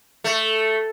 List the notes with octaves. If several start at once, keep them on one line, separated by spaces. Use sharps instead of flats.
A3